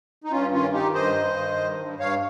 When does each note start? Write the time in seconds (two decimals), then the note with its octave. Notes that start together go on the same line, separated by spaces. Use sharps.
0.24 D#4
0.31 G2 C#4 F4
0.52 D#3 C#4 F4
0.73 D#3 D#4 G4
0.94 G2 C5 D#5
1.16 G2
1.37 D#3
1.57 G2
1.79 G2
1.99 G2 C#5 F5